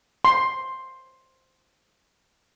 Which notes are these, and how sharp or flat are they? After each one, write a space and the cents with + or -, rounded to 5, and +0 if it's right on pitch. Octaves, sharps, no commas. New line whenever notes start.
C6 +10